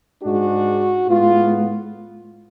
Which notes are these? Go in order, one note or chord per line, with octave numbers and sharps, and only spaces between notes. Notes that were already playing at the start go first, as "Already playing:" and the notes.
G#2 G#3 D4 F#4
A2 G#3 B3 F4